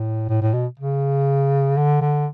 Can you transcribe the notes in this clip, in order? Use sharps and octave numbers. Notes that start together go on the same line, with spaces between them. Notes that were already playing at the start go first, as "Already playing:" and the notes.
Already playing: A2
A2
A2
B2
C#3
D3
D3